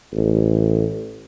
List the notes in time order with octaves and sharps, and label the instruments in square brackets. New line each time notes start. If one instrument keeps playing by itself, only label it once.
[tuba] A1